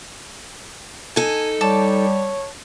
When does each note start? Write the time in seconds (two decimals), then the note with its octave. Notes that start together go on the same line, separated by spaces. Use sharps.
1.16 D#4 A4 G#5
1.61 G3 C#5 A5 D6